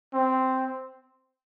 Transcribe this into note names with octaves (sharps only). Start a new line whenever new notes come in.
C4